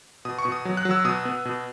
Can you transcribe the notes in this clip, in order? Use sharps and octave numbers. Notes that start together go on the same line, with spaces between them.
B2 D#6
C#6
B2
D#6
F#3
F#6
F#3
E6
B2 D#6
B3
B2